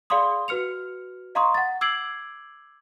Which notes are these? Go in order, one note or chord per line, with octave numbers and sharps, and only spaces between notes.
G#4 D5 F5 B5 C6 D#6
F#4 B4 F6 C#7 F7
D#5 F5 A#5 C6 C#6 D#6
F#5 A6
D6 E6 G#6 C7 D7 F#7